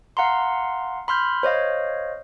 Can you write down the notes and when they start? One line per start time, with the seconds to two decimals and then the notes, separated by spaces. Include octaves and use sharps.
0.17 F5 F#5 A#5 C6
1.08 B5 C6 F6 G6
1.43 C5 C#5 D#5 F5